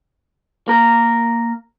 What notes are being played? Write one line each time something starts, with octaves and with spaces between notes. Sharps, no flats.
A#3 A#4